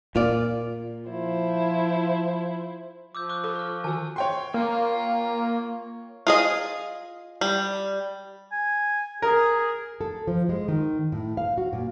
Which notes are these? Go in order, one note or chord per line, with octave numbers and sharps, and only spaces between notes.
A#2 F4 D5
F3 E4 C5
F3 D6 E6 G6
C#6 D6 F#6
A4
C#6 F6
D#3 F#4 G#5 E6
C#5 G5 C6
A#3 F4
F4 G#4 D#5
G3
G#5
G#4 A#4
A4
F3
G#3
D#3
A2
F5
F#4
A#2